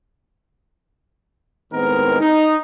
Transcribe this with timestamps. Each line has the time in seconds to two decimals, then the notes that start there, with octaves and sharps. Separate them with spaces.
1.73 A2 D#3 G#3 B3 C4 A#4
2.21 D#4